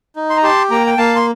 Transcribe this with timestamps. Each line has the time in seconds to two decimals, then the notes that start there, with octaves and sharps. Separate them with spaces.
0.16 D#4
0.30 C6
0.37 A#5
0.43 G4 A5 C6
0.71 A#3 G5 A#5
0.87 G5
0.98 A#3 F5 A5
1.16 C6